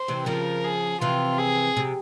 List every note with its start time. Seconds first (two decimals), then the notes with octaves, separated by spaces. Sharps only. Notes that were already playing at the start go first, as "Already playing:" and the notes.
Already playing: C5
0.08 C3 E3
0.26 C#3 F3 A#4
0.64 G#4
1.01 C3 E3 F4
1.38 G#4
1.77 C3